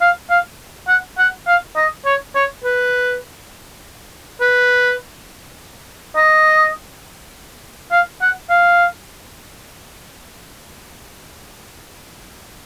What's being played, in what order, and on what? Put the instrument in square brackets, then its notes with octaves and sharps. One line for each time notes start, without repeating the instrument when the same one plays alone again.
[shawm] F5
F5
F#5
F#5
F5
D#5
C#5
C#5
B4
B4
D#5
F5
F#5
F5